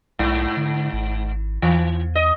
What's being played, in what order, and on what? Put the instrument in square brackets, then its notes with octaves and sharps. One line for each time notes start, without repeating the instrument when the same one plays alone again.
[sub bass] B1 [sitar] G#2
[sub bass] D3
G#1
[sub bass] E2 [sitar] E3
[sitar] D#5